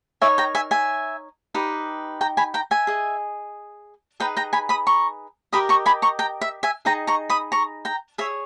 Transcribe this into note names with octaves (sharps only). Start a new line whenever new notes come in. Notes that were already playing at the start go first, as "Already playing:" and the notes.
D#4 A#4 C#5 E5 G#5
G5 A#5
E5 G#5
E5 G#5
D#4 G4 B4
G5 A#5
G#5 B5
G5 A#5
E5 G#5
G#4 D#5
D#4 G#4 B4 G5 A#5
G5 A#5
G#5 B5
B5 D#6
A#5 C#6
G4 A#4 D#5 B5 D#6
A#5 C#6
G#5 B5
A#5 C#6
G5 A#5
E5
E5 G#5
D#4 G#4 D#5 G5 A#5
A#5 C#6
B5 D#6
A#5 C#6
G5 A#5
G#4 C#5 E5